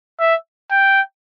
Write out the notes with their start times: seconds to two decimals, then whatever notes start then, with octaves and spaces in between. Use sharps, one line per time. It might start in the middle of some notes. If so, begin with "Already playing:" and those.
0.20 E5
0.71 G5